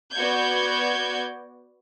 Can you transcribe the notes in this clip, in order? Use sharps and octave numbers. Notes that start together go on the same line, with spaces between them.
B3 F#4 D5 G6 G#6